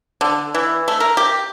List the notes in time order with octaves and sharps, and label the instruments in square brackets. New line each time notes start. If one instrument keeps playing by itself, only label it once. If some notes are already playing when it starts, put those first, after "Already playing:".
[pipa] D3
E3
A3
A#4
G4